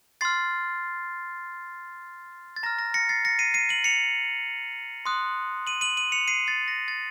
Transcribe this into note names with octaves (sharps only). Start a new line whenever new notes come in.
C6 F6 A6 C7
A6
A#5 F6 A#6
A#6
A#6 C#7
A6 C7
A#6 C#7
C7 D#7
C7 D#7
D#7 F#7
C#7 F7
C6 D#6 F#6
D#7 F#7
D#7 F#7
D#7 F#7
C#7 F7
C7 D#7
A6 C7
A#6
A6